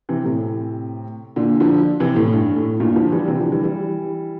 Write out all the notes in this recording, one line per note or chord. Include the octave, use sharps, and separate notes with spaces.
C3 E3
A2 C3
A#2 D3
D3 F3
C3 E3
A2
G2
A2
G2 A#2
D3 F3
E3 G3
C3 E3
D3 F3
E3 G3
E3 G3